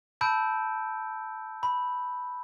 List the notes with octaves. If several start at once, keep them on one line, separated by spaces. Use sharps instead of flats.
A5 B5 E6 G6 D7
B5